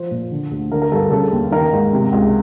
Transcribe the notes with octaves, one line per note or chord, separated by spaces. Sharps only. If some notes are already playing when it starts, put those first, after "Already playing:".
Already playing: F3 C5
A#2
D3
D2
D3 A#4
A#4
G2 A4
C#3 A4
D#2
D#3 A#4
G#2
C3
C#2